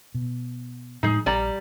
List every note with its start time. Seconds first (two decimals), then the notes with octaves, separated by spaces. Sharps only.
0.14 B2
1.03 A2 F3 G#3 D#4 G#4
1.26 A#1 G3 D5 A#5